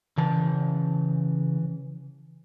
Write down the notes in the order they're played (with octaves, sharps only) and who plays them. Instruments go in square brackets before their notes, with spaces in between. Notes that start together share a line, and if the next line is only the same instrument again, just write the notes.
[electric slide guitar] C#3 A5 [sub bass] E3